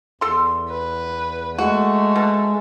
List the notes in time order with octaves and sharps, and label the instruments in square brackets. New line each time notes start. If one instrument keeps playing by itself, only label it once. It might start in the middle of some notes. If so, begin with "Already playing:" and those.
[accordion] E2 [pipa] A4 C6
[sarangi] B4
[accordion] G#3 [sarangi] A3 [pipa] F#4
[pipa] B2